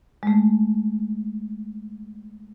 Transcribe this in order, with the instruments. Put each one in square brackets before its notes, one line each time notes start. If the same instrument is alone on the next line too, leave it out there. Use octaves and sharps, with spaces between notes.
[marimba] G#3 A3